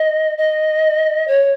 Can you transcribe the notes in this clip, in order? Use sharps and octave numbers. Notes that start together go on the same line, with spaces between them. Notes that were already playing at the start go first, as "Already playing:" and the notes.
Already playing: D#5
D#5
C#5